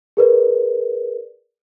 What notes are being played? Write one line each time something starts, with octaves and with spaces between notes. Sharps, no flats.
G#4 A#4 B4 D5